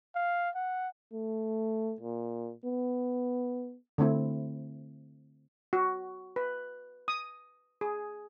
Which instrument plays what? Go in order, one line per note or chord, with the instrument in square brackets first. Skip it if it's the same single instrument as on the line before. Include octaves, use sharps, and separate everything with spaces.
[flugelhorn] F5
F#5
[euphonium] A3
A#2
B3
[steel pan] D3 A3 C4 E4
F#4
B4
D#6
G#4